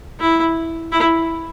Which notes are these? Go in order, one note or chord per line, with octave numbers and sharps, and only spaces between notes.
E4
E4